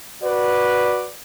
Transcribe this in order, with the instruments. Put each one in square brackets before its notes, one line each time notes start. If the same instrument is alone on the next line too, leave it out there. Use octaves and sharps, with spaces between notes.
[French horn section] F#4 B4 D5